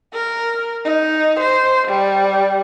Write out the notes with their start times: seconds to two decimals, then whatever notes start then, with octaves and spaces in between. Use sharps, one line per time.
0.13 A#4
0.85 D#4
1.40 C5
1.88 G3